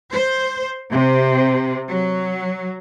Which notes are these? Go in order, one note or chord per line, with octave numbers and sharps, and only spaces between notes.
C5
C3
F#3